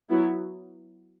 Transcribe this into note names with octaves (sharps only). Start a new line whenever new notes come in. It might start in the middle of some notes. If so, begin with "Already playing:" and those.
F#3 B3 E4